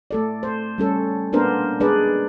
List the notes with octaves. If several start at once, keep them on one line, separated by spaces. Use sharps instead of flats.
A3 A4 D5
C5
G3 C#4 A4
A#3 B3 D4 A#4 C5
G#3 D4 G#4 B4 D5